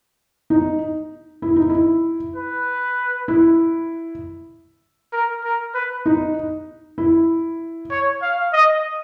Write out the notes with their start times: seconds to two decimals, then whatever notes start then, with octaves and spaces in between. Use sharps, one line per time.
0.50 D#4
1.42 E4
1.56 D#4
1.70 E4
2.36 B4
3.28 E4
5.13 A#4
5.44 A#4
5.75 B4
6.06 D#4
6.98 E4
7.91 C#5
8.22 F5
8.53 D#5